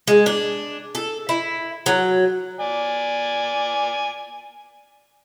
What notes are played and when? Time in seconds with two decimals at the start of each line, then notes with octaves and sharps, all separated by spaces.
0.08 G#3
0.26 D4
0.95 A4
1.29 E4
1.86 F#3
2.60 D5 G#5